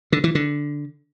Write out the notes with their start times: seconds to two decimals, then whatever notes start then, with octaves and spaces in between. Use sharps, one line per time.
0.12 D3
0.24 E3
0.35 D3